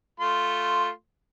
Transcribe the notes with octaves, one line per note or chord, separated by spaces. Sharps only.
A3 F4 C6